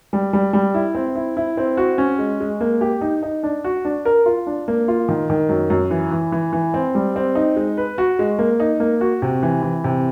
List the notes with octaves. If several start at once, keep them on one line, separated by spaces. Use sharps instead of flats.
G3
G3
G3
E4
C4
E4
E4
C4
F#4
C#4
G#3
G#3
A#3
G4
D#4
D#4
D4
F#4
D4
A#4
F4
D4
A#3
F4
D#3
D#3
F#2
F#2
E3
E3
E3
E3
C4
G3
C4
D#4
G#3
B4
F#4
G#3
A#3
D#4
A#3
F#4
C3
E3
E3
C3